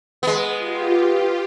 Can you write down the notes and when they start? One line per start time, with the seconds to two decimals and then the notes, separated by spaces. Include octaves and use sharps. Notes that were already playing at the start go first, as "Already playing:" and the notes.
0.23 G#3 B3
0.57 F4 G4